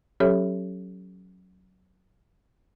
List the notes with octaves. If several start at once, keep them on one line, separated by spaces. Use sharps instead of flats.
F#3 C#4 G4 A4 C#5 E5